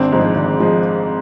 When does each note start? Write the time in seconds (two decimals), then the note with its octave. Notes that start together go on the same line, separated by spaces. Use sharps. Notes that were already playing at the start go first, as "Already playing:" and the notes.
Already playing: G#1 C4 D4
0.12 G#2 F3 G#3
0.36 G#1
0.60 F3 G#3